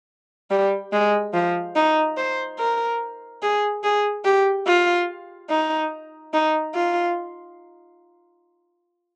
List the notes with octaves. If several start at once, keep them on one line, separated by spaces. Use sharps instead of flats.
G3
G#3
F3
D#4
C5
A#4
G#4
G#4
G4
F4
D#4
D#4
F4